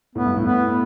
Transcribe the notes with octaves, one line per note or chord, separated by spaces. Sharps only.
A2 B3
G2
A2
B3